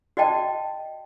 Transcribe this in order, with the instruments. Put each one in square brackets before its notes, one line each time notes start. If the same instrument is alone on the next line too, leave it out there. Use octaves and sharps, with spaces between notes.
[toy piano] F#4 D5 D#5 G5 A5